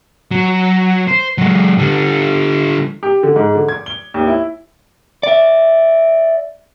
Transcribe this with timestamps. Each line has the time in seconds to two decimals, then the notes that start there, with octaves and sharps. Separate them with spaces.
0.31 F#3
1.08 C5
1.38 F#3 G#3
1.78 D3 G3
3.03 G4
3.23 D3
3.36 G#2
3.55 D3
3.68 G#6
3.86 G7
4.14 D#2
4.27 E4
5.23 D5 E5